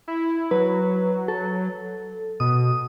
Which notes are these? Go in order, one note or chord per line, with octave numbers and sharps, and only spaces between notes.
E4
F#3 B4
A4
B2 D#6